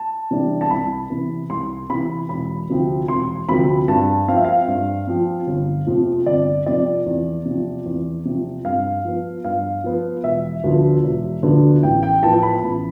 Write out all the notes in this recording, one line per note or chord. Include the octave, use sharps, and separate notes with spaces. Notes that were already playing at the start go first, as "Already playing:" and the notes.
Already playing: A5
C3 E3 G3 D4
A5
C2 B5
C3 E3
C2 C6
C3 E3 B5
E1 B5
D2 C3 F3 C4
E1 C6
D2 C3 F3 C4 B5
G2 A5
F3 C4 F5
E5
F5
G2
F3 C4
G1
F2 C3 F3
G1 D5
F2 C3 F3 D5
E2
C3 F3
E2
C3 F3
G2 F5
F3 B3
G2 F5
F3 B3
E1 E5
D2 D3 F3 B3
E1
D2 D3 F3 B3
A1 G5
G5
A2 F3 B3 A5
B5
A1